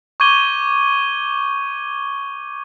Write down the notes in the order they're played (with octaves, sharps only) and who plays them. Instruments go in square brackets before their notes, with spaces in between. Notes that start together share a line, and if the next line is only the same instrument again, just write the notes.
[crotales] C#6 D6 G6 G#6 D#7 G7